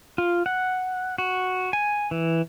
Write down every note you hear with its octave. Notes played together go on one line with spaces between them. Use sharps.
F4
F#5
F#4
G#5
E3